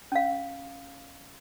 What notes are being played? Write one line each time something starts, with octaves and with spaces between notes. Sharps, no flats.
C#4 F5